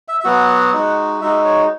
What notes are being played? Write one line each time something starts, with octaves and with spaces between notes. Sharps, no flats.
E5
E5
F#3 B3 F#4 F#5
G#3 D#4 F#4
G#3 D#4 F#4 E5
C#5